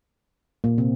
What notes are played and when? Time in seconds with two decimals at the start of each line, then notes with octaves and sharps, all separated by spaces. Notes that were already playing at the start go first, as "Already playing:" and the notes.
0.64 A#2 A#3
0.78 C3 C4